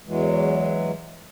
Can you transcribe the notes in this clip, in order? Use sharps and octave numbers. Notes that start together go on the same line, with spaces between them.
E2 E3 F#3 G#3